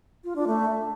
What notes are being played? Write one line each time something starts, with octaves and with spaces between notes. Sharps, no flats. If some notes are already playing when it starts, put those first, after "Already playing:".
F4
D4
A3